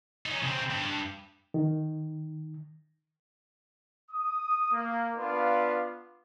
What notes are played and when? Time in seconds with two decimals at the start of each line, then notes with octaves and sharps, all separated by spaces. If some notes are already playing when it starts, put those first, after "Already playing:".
0.26 C#4 D#4
0.43 C#3 C4
0.70 G2
1.54 D#3
4.11 D#6
4.72 A#3
5.16 B3 D4 F4 B4 D5 F5